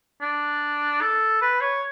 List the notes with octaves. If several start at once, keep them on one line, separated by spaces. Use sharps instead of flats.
D4
A4
B4
C#5